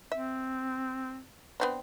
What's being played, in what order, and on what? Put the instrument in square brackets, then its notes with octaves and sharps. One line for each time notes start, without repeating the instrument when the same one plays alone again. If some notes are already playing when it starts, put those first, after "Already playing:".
[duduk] C4 [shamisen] E5
[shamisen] B3 C4 D4